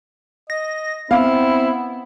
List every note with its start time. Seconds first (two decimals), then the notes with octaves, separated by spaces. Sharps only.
0.50 D#5 A#6
1.11 B3 C4 E4 F5